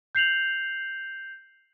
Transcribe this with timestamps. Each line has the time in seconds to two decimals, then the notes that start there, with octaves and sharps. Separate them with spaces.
0.15 G6 C7 F7 F#7